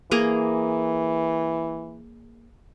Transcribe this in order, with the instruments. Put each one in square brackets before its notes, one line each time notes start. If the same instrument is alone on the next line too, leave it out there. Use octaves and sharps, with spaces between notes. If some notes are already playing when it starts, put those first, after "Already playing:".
[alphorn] E3 [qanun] A#3 G#4 A#5